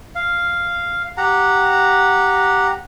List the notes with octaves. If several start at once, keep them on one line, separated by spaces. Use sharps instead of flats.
F5
G4 F#5 A#5